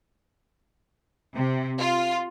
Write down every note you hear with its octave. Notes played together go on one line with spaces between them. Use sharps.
C3
F4